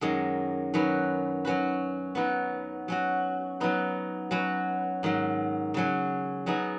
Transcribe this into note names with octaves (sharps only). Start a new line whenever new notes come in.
F#2 D#3 G#3 C#4
D#3 F#3 C#4 B4
F#3 C#4 F#4 B4
F#3 B3 D#4 B4
F#3 C#4 F#4
F#3 B3 D#4 B4
F#3 C#4 F#4 B4
G#2 D#3 F#3
C#3 F#3 C#4
F#3 B3 D#4 G#4